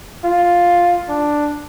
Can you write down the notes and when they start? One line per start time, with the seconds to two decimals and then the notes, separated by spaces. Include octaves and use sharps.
0.25 F4
1.09 D4